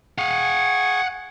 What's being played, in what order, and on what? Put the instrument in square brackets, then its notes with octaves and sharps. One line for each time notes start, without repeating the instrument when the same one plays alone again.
[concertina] G#4 G#5 C#6 [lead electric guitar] F5 F#5